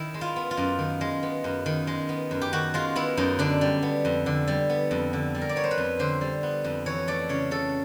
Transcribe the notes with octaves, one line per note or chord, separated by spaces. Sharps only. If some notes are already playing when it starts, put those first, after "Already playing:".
Already playing: D#3 E4
G#3
F4
B3
F4
F#2
D#3
G#3
B3
F#2
D#3
G#3
B3
F#2
G4
D#3 F#4
G#3 F4
B3 E4
F#2 D#4
D3 D4
G3
B3
F2
D3
G3
B3
F2
D3
G3
A#4
D5
B3 C#5
C5
B4
F2
D3 C5
G3
B3
F2
E3 C#5
A3 D5
C#3 C#5
C#3 A4